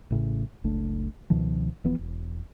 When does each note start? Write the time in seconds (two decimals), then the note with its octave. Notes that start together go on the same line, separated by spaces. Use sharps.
0.10 A1 A2 C#3
0.64 F#1 C#2 A3 D4
1.30 C#2 B2 D#3 F3
1.84 D#1 E3 F3 B3
1.99 E1